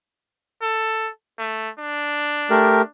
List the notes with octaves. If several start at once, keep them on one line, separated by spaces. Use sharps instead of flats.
A4
A3
D4
A3 G4 A#4